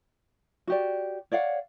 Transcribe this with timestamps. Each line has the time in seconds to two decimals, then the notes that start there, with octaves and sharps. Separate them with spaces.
0.67 F#4 G4 D5
1.32 C#5 D5 F5 F#5